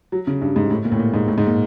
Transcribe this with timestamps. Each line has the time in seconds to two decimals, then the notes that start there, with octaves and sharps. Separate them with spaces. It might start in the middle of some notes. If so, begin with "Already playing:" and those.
0.12 F#3
0.27 C#3
0.41 G2
0.56 G#2
0.70 A2
0.85 A#2
0.92 A2
0.99 A#2
1.14 G#2
1.28 A2
1.38 G#2
1.47 A#2